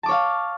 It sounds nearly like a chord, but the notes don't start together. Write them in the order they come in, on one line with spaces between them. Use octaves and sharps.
A5 D6 C#5 F5